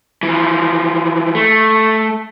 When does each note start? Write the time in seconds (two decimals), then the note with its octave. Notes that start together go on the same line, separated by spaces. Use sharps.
0.23 E3 F3
1.35 A3